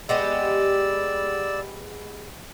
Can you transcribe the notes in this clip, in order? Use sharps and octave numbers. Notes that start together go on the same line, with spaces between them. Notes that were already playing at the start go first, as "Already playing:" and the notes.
G#3 B3 G4 D5 E6